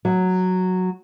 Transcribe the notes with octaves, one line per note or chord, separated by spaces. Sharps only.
F#3